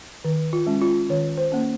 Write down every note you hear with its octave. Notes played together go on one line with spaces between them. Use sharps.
D#3
F4
G#3 C#4
F4
D#3 C#5
C5
A#3 C#4